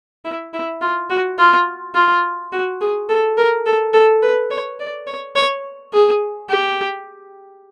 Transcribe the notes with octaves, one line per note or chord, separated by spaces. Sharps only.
E4
E4
F4
F#4
F4
F4
F#4
G#4
A4
A#4
A4
A4
B4
C#5
D5
C#5
C#5
G#4
G4